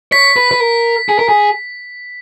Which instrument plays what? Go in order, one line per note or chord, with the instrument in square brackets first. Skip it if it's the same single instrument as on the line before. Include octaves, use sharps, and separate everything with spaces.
[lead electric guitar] C#5 [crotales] B6
[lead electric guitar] B4
B4
A#4
G#4
A#4
G#4